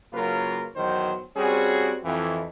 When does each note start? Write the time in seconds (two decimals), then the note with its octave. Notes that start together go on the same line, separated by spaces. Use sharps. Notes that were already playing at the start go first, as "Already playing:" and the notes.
0.13 C#3 F#3 A#3 F4 A#4 B4
0.76 E2 B2 D#3 F#3 C5
1.37 G3 C4 C#4 F#4 G#4
2.04 F2 E3